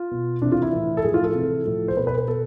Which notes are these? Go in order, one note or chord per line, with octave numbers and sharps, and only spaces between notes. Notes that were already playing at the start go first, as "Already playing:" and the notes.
Already playing: F4
B2
C3 E3 D4
F4
E4
A2 E3
A4
A2 F3 G#4
F4
A4
C3 E3
A2 F3
C5
B2 B4
B4
B4
B2 A4